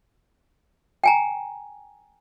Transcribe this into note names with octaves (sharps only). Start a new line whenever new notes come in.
G5 G#5 A#5